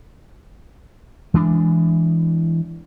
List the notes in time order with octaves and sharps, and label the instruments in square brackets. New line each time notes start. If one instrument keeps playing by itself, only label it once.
[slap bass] E3 G#3 D4